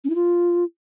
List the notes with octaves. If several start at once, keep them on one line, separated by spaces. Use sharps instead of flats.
C#4
E4
F4